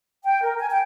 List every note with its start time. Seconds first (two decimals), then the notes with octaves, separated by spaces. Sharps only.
0.23 G5
0.43 A#4
0.59 G#5
0.71 G5